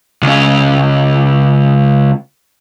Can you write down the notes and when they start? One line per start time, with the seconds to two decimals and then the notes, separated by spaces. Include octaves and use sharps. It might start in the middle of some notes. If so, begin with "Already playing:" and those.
0.22 C#2 C#4